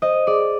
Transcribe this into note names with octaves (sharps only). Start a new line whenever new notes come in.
C5 D#5
G#4 D5